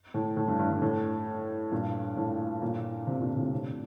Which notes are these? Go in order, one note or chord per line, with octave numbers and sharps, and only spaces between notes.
A2
A2
G2
G2
G2
A2
G2 A#2
A2
G2 A#2
A2 C3
A#2 D3
A2 C3
A2 C3